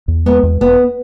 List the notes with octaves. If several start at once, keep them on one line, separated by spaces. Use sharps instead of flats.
E2
G#3 B3
E2
E1 B3